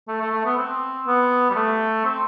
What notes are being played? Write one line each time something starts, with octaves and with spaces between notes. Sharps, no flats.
A3
A3
A3
B3
C4
B3
G3
A3
C4